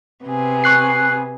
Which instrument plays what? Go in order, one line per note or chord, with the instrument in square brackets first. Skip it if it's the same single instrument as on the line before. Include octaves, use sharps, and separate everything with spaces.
[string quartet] C3 B3 G#4
[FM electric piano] C#6 F#6 C7